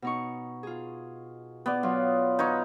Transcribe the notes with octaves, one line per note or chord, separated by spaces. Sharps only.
B2 D#4 C#6
F4 G#4
B3 D5
F#3 F4
D#4 B4 C#5